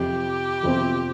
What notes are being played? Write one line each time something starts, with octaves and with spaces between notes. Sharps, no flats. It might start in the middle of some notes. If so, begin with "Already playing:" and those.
Already playing: F2 C3 F3 C4 G4
F2 C3 F3 C4